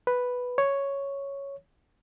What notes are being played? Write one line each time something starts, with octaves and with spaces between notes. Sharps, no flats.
B4
C#5